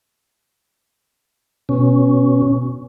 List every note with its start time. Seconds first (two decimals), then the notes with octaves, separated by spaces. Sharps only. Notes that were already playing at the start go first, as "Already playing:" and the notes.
1.69 B2 C#4